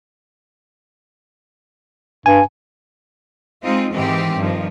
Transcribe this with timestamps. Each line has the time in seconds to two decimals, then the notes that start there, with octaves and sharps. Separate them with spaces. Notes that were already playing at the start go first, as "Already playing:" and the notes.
2.26 G2 G#5
3.62 G#3 C4 D#4 F4
3.92 G#2 D#3 E3 C4 G4
4.37 G2 D#3 F3